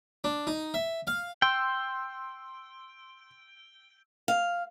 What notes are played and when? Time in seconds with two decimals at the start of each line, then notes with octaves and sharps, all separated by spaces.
0.24 D4
0.47 D#4
0.74 E5
1.07 F5
1.42 G5 C6 E6
4.28 F5